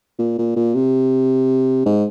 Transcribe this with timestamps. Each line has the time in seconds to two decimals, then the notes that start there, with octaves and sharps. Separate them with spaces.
0.19 A#2
0.38 A#2
0.56 A#2
0.75 C3
1.86 G#2